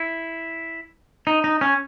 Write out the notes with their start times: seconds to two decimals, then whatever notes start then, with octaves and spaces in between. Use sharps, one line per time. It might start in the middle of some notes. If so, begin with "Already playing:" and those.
Already playing: E4
1.27 D#4
1.44 D#4
1.61 C#4